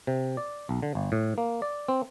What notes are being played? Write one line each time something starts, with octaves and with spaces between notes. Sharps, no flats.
C3
D5
B1
D3
G1
A2
A#3
D5
C4